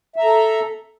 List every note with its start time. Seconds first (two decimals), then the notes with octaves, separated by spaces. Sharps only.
0.16 E5
0.20 A#5
0.24 A4